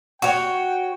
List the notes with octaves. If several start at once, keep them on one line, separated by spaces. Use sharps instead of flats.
F#4 C#5 G5 C#6